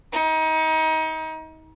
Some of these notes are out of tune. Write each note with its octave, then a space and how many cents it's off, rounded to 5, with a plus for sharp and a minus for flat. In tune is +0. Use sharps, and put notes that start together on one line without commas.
D#4 +30